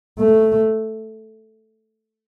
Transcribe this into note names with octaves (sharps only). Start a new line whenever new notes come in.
A3